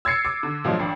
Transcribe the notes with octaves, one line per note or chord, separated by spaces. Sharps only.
E6 G#6 A6 C7 C#7
D6
D3
A#2 F3 F#3 G#3 D4
A1 D4